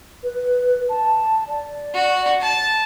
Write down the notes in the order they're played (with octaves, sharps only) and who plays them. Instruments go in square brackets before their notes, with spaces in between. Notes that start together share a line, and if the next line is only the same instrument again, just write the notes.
[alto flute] B4
A5
D5
[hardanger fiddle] F#4
A5